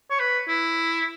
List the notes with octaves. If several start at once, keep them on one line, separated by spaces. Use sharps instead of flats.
C#5
B4
E4